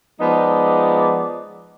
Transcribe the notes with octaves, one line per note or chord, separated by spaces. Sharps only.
F3 G#3 B3 D#4 D5